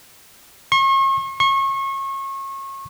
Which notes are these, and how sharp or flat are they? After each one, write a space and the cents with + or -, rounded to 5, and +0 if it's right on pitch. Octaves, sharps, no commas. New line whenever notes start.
C#6 -40
C#6 -30